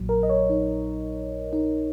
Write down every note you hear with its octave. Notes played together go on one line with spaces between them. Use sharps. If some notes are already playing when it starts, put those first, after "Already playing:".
Already playing: A#1 A#2 F#3
A#4
D#5
C#5
D#4
D#4